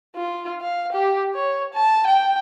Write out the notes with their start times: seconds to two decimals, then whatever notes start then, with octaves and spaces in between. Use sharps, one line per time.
0.16 F4
0.61 F5
0.92 G4
1.35 C#5
1.74 A5
2.07 G5